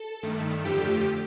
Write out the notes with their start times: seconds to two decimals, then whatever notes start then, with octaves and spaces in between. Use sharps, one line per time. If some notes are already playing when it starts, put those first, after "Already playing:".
Already playing: A4
0.23 G2 D#3 A3
0.65 F2 D3 F3 A3 G4